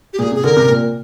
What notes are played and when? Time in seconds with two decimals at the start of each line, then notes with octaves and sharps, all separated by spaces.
0.13 G4
0.19 A#2 G#4
0.31 C3
0.36 G#4
0.44 D3 A#4
0.57 C3
0.69 A#2